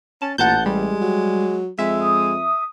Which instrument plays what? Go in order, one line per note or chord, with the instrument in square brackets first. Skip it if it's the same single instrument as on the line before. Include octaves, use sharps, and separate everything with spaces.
[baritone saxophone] C#4 [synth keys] A5
[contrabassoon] A1 [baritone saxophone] A#2 [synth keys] F#5 A5 G6
[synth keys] G3 [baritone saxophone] G#3
[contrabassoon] F#3
[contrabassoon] F2 [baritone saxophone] G#3 [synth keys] E5
[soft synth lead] D#6